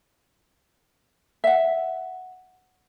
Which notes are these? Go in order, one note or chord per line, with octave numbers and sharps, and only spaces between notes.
E5 F#5